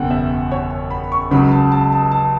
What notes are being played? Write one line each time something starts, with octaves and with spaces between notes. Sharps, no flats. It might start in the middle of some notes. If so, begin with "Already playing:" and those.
Already playing: F#1 E2 B2 F#5 G5
E5
C#5
B5
C#6
C#2 C#3 F#3 B5
A5
A5
A5
A5